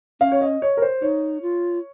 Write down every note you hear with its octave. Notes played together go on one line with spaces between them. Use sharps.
C#4 F5
C#5
D#5
C#5
A#4
C5
D#4 C#5
F4